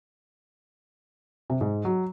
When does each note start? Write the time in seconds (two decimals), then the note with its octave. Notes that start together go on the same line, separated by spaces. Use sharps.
1.50 C3
1.61 G#2
1.85 F#3